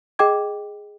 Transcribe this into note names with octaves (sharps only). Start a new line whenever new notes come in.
G#4 D#5 G5 D6 G#6